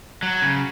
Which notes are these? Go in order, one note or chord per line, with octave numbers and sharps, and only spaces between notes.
F#3
C#3